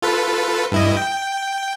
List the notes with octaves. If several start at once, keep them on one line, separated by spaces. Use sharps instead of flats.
F4 A4 B4
G2 E4 D#5
G5